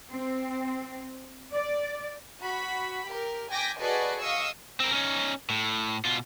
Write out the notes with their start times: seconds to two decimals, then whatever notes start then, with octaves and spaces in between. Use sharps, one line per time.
0.11 C4
1.51 D5
2.42 F#4 B5
3.06 G4 A#4
3.51 G5 G#5 D6 G6 A#6 B6
3.80 F#4 G#4 A4 B4 D5 D#5
4.21 D#5 F5 C#6 D#6 E6
4.80 C4 A#4
4.92 C#4 D#4
5.50 A2
6.05 B2 F4